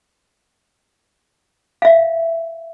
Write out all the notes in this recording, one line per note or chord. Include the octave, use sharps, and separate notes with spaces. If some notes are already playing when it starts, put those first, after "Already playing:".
E5 F5